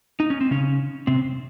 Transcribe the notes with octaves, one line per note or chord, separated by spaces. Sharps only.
D#4
C#4
C4
C#3 C#4
C3 C4